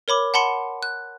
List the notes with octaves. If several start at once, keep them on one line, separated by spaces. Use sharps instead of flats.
A#4 C#5 B5 D6
F#5 A5 B5 C6 C#7
F#6